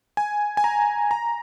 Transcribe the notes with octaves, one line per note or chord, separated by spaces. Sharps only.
G#5
G#5
A#5
A#5